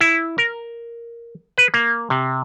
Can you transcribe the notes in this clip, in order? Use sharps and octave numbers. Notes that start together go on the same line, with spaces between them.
E4
A#4
B4
A#3
C3